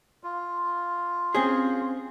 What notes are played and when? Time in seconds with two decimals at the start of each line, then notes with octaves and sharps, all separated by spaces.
0.24 F4
1.35 C4 C#4 G#4